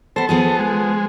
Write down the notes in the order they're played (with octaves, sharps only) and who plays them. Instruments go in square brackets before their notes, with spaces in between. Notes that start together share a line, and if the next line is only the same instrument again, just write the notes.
[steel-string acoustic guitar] B3 C5 [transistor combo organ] A4
[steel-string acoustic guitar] F3 B3 G#4
[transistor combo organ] G#3